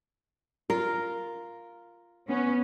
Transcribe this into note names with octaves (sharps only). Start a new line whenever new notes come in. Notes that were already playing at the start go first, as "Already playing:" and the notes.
F4 A#4 F5
B3 C#4